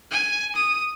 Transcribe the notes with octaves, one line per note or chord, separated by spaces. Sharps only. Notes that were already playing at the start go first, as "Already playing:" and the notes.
G#5
D#6